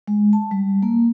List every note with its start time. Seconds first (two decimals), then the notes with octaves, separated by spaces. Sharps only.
0.08 G#3
0.33 A5
0.51 G3
0.82 A#3